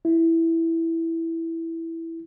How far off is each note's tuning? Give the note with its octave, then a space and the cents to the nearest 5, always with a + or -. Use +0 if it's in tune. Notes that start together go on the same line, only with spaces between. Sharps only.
E4 +0